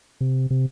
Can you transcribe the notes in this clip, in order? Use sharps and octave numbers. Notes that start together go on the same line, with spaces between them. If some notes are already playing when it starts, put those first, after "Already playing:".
C3
C3